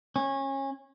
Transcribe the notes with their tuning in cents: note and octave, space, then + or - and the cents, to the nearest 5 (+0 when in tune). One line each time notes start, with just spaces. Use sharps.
C#4 -25